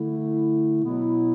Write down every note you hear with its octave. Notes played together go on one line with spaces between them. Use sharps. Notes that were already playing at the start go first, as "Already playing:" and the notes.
Already playing: D3 A3 E4
B2 F#3 B3 E4